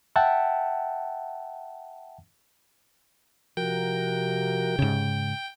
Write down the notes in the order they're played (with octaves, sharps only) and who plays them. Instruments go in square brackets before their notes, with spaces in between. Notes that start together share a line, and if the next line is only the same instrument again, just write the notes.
[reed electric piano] E5 F#5 G5 A5
[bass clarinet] C3 [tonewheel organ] F3 F#4 A#4 [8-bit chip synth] G5
[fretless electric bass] G#2 C#3